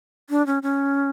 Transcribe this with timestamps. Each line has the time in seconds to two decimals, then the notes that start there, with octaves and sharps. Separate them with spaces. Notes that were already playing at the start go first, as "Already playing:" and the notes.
0.30 D4
0.47 C#4
0.63 C#4